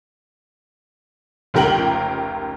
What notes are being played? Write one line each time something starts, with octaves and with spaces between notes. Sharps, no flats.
F1 C#2 G4 A#4 G5 F#7